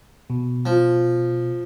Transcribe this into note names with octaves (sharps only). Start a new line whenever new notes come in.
B2
F3